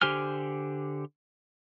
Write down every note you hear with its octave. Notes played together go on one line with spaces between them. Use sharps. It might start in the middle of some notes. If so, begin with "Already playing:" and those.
D3 G4 C5 G#5 F6